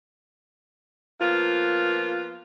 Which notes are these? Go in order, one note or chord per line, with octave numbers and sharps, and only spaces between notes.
F3 A#3 B3 F4